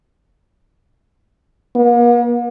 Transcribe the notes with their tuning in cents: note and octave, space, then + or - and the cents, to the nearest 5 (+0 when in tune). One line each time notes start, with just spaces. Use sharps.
A#3 +45